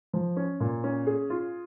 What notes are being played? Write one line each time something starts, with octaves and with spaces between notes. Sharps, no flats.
F3
C#4
A#2
C#4
G#4
F4